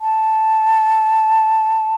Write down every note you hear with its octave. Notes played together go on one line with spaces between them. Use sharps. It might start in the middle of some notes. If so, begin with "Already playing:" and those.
A5